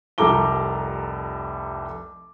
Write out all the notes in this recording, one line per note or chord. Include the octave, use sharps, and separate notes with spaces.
F1 C2 A4 A#5 D6 G7